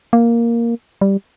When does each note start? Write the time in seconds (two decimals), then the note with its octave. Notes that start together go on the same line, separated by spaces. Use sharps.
0.13 A#3
1.01 G3